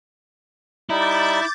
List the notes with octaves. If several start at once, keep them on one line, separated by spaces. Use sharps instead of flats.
G3 D#4 E4 D6 G6 A6